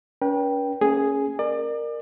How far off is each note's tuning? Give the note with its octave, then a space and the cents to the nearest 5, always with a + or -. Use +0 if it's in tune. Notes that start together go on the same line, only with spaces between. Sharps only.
C#4 +40 B4 -40 G5 +0
A#3 -40 C#4 +0 G#4 +0
A#4 +0 D5 +35